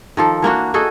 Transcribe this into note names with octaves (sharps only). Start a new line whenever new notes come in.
D#3 F3 A4
E3 A#3 D4 F#4
F#4 G#4 A4 D#5